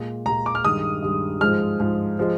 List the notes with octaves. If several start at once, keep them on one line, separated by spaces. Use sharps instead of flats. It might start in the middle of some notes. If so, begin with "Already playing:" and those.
Already playing: A#2 G#3
A#2 G#3 A#5
D6
F6
G2 D#3 G#3 D#6
G2 D#3 G#3
G#2 F3 G#3 F6
G#2 F3 G#3
F3 G#3